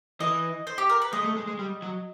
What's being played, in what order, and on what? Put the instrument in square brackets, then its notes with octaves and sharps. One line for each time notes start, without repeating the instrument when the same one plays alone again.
[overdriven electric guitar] E3 [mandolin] D#5
[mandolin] C5
G4
A#4
B4
[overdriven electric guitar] G#3 [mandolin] D#5
[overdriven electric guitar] A3
G#3
G#3
G3
F#3